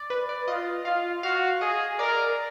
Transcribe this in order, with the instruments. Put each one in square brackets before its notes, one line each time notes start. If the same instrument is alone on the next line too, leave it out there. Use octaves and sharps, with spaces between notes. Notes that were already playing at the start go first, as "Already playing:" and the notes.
Already playing: [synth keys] D5
B4
D5
[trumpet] F4 [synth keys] D#5
[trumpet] F4 [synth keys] F5
[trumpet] F#4 [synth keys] F5
[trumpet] G#4 [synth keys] D#5
[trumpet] A#4 [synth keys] D5